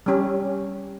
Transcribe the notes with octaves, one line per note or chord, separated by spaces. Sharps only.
G3 C#4 G4